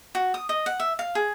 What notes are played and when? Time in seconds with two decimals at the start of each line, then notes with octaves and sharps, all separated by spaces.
0.15 F#4
0.34 D#6
0.49 D#5
0.66 F#5
0.80 E5
0.99 F5
1.15 G#4